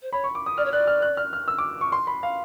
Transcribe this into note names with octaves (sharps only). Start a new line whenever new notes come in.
C5
C#5 B5
C#6
D6
D#6
D5 F6
C#5
D5 F#6
F6
F#6
F6
F6
E6
D6
C#6
C6
B5
F5